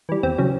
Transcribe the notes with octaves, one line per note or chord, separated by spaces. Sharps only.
E3 G3
E2 C4
C#3 F#3